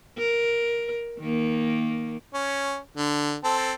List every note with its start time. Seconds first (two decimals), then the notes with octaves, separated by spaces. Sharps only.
0.19 A#4
1.20 D#3 A#3
2.34 C#4
2.97 D3
3.44 C4 A4